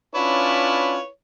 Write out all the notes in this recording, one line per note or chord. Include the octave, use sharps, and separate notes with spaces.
C#4 D4 E4 F4 B4 C#5